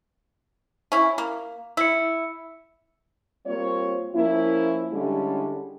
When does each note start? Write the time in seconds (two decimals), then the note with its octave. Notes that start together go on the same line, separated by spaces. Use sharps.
0.92 C#4 E4
1.18 A#3
1.77 E4 E6 C#7
3.46 G3 A#3 C4 F4 C#5
4.15 F3 A#3 C#4 E4
4.93 D3 G3 G#3 C#4 E4 G4